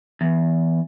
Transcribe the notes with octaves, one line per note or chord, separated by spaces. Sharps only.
E2